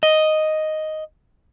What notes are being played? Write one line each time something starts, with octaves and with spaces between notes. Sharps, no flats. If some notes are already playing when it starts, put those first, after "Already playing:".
D#5